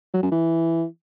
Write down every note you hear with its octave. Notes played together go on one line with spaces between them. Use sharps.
F#3
F#2
E3